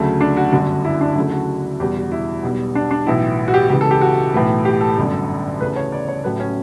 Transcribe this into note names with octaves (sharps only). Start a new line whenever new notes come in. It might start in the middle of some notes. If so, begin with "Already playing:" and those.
Already playing: D2 C#3 F#3 A3
D4
F#4
G1 F#2 D3 F#4
E4
D4
D2 C#3 F#3 A3 E4
F#4
E2 B2 G3 G4
F#4
E4
B1 B2 G3
D4
D4
B1 A2 E3 E4
F#4
G4
C#2 C#3 E3 G4
A4
G4
F#4
B1 A2 E3 A3
G4
A4
G1 F#2 D3 A4
D2 C#3 E3 A3 B4
C#5
D5
C#5
A1 A2 F#3 A3 B4
C#4